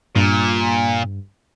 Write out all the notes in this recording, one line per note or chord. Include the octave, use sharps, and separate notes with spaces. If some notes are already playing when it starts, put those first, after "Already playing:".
G2 A#2